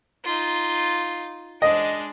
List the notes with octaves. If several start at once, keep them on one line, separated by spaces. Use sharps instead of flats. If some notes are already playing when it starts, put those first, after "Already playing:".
D#4 F4
G#3 D4 D#5